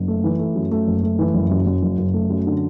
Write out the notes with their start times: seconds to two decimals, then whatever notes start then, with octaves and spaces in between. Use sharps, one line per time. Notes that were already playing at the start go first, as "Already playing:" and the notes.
Already playing: F#1
0.08 A3
0.24 E3
0.39 A3
0.56 F#2
0.71 A3
0.87 F#1
1.03 A3
1.19 E3
1.34 F#1
1.51 F#2
1.67 F#2
1.83 F#1
1.98 F#1
2.14 A3
2.30 F#2
2.47 D3